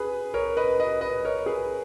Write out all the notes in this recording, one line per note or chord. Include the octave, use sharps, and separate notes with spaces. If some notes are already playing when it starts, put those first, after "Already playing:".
Already playing: G#4 B4
A#4 C#5
B4 D#5
B4 D#5
B4 D#5
A#4 C#5
G#4 B4